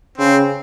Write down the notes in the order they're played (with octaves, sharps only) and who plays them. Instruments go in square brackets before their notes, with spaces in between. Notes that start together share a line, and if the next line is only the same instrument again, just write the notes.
[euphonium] C#3 [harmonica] C4